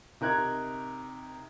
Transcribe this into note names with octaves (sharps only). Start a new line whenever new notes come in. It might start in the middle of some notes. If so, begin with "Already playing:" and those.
C3 D#4 A#4 F#6 G#6